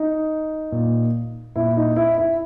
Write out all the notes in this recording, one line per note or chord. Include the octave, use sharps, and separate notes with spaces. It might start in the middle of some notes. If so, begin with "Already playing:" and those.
Already playing: D#4
A#2
A#2 E4
D#4
E4
E4